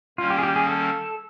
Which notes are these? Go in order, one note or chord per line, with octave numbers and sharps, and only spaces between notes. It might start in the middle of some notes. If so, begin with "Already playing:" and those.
D#3 G3 A#3 C#4 F4
G4
G#4
G4
G#4
A4